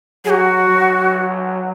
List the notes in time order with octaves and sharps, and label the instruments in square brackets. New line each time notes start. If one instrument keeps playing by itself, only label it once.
[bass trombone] F#3 [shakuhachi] G#4
[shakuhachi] F#4
[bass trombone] F#3